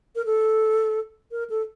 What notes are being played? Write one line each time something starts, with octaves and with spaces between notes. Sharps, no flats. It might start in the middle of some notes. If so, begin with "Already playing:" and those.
A#4
A4
A#4
A4